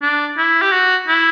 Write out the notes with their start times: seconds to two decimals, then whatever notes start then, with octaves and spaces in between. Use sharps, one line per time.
0.02 D4
0.38 E4
0.62 G4
0.72 F#4
1.08 E4